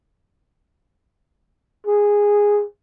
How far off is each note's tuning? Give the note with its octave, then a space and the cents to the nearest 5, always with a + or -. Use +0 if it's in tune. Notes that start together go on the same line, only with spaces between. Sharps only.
G#4 -10